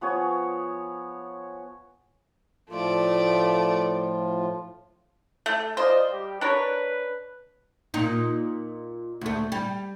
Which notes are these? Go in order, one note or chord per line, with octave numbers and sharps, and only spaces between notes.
F3 B3 G#4 C#5
A2 F3 A3 F4 D5
A3
F4 C5 D5 D#5
G3 G4
D4 A#4 B4 C#5
A#2 D#4
D2 A3
G3